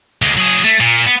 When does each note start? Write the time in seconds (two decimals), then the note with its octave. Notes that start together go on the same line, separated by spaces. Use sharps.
0.22 D2 G#3
0.38 F#3 G#4
0.64 A3
0.80 A#2
1.06 B3